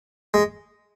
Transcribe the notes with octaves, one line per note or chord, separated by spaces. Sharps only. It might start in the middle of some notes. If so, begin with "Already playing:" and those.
G#3